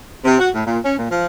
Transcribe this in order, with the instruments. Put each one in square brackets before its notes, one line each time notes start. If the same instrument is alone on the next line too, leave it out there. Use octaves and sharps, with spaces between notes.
[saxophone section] C3
F#4
A2
A#2
C#4
A#2
F3